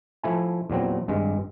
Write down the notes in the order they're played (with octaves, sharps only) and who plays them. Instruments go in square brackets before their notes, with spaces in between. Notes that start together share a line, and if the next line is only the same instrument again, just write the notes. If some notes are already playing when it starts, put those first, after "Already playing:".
[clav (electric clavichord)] F3 A3 E4 G#5
E2 A#2 F#3 C4
G#1 G2 G#3